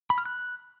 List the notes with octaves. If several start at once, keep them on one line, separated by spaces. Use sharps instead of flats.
B5
F6
F#6